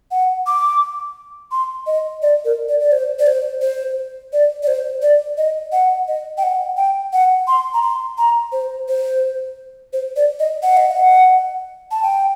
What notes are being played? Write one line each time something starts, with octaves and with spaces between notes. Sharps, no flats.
F#5
D6
C6
D#5
D5
A#4
D5
D5
C5
D5
C5
C5
D5
D5
C5
D5
D#5
F#5
D#5
G5
F#5
G5
F#5
C6
A#5
C6
A#5
C5
C5
C5
D5
D#5
F#5
D#5
F#5
A5
G5